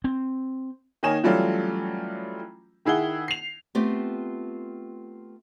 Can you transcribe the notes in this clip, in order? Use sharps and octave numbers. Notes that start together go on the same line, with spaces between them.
C4
D#3 A#3 D#4 C#5 G#5 E7
E3 F#3 G3 A3 C#4 F4
D#3 E4 G#4 F#5 G7
C7 F7
A3 B3 C4 F4 G4